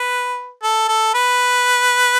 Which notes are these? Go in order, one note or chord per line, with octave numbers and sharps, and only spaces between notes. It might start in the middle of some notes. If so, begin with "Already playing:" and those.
Already playing: B4
A4
A4
B4